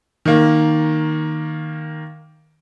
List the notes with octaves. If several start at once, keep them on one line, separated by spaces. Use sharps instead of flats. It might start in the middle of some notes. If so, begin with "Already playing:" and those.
D#3 A#3